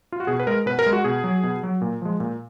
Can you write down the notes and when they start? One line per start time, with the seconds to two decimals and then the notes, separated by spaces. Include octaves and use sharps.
0.12 F4
0.20 F#4
0.27 B2 G#4
0.40 B4
0.47 G#3 A#4
0.66 B2 B4
0.79 A#4
0.86 G#3
0.93 F#4
1.04 B2 G#4
1.24 F#3
1.43 B2
1.63 F#3
1.81 A#2
2.02 F3 G#3
2.20 A#2